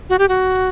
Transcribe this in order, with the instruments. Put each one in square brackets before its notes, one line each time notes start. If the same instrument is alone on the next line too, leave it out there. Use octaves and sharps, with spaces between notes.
[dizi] F#4
G4
F#4